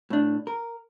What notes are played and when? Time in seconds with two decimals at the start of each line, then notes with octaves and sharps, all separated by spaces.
0.10 A2 D4
0.47 A#4